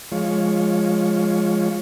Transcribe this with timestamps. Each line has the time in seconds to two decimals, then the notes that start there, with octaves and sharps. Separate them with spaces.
0.12 F3 G#3 F4 C#5